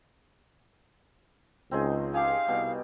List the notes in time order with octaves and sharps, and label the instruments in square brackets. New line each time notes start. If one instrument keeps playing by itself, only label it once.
[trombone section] C#2 [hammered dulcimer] C4 D#4 G#4
[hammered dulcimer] G4 G#4 [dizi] F5
[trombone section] C2 [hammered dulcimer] B2 G3